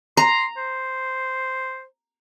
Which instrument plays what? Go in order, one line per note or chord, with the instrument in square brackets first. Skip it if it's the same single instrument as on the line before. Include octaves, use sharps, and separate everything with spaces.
[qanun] A#5 [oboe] C6
[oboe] C5